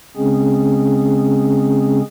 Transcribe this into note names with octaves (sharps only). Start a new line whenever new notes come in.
C#3 G#3 C4 C#4 G#4